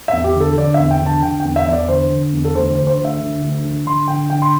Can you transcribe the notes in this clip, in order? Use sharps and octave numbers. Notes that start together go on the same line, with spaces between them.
E5
E2
G4
D3 A4
D3 D5
E5
E2
G5
D3 A5
D3 G5
G5
E2
E5
E2 E5
D5
D3 C5
D3
E2
A4
D2 C5
C5
D3
C5
D2
E5
D3
D2
D3
D3 C6
D3 G5
D3 G5
C6